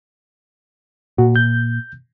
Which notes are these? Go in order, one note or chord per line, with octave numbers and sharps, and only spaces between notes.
A#2 F#4
G6